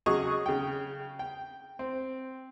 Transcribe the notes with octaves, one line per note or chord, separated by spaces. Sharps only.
C#3 F#3 G#4 D#5 C#6 D#6
C#3 G5
G5
C4